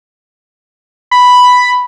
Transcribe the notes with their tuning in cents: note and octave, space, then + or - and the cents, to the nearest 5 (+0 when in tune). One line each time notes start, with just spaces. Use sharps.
B5 +5